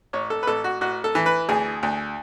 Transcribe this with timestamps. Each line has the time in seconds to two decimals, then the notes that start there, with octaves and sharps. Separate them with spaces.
0.13 A1 C#5
0.30 A4
0.43 B4
0.47 A1 A4
0.64 F#4
0.81 A1 F#4
1.04 A4
1.15 E3
1.26 B4
1.49 D2 G#4
1.83 D2